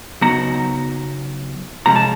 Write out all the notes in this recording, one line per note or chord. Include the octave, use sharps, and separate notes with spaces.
C#3 F#3 B3 D#4 A#5
C3 F3 G#3 C#4 A#5
A5